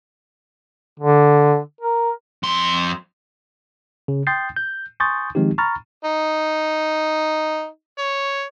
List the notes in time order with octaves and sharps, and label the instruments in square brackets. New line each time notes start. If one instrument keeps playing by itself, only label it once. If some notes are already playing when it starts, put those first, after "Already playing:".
[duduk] D3
A#4
[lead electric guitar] F2 C6
[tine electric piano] C#3
G5 C6 D#6 G6 A6 C7
G6
G#5 C6 C#6 D#6 G6 A6
D#3 F3 G#3 C4 D#4 G4
A#5 B5 C#6 F6 A6
[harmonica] D#4
C#5